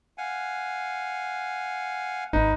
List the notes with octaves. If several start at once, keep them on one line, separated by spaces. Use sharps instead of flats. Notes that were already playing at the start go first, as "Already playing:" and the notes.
F5 F#5 G#5
G#1 D#4 B4